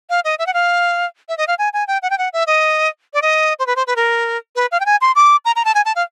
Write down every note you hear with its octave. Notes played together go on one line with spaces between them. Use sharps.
F5
D#5
E5
F#5
F5
E5
D#5
F5
G#5
G#5
G5
F#5
G5
F#5
E5
D#5
D5
D#5
C5
B4
C5
B4
A#4
B4
F5
G5
G#5
C6
D6
A#5
A#5
A5
G#5
A5
F5